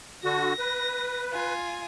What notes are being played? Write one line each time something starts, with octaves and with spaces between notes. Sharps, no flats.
D3 F#4 A#6
B4
F4 G#5